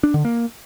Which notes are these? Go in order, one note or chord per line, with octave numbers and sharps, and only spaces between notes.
D4
D3
A#3